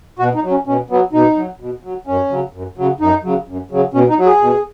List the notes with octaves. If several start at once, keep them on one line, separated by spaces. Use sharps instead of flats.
B2 F#4
D#4
F#3
C#4
B2 C#4
F#3 B3
B2 D#4
F#3
B2
F#3
F#2 C#4
C#3 F#3
F#2
C#3 F#3
F#2 D#4
C#3 F#3
F#2
C#3 F#3
B2 C#4
D#4
F#3
G#4
B2